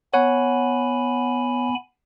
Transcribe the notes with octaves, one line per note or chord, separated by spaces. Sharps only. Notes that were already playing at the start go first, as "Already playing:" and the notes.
B3 C#5 F#5 G#5 B5